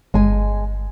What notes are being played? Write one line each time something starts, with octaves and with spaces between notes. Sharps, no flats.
G1 G#3 G#5